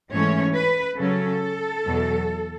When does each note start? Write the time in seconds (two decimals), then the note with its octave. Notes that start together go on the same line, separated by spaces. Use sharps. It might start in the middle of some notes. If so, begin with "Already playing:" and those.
0.11 G#2 E3 A3 C#4 C#5
0.54 B4
0.97 C#3 F#3 C#4 A4
1.83 E2 B2 F#3